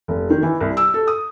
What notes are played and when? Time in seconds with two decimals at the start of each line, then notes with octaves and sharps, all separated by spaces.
0.08 F1
0.30 D#3
0.43 E3
0.61 C2
0.77 E6
0.94 A4
1.08 D#6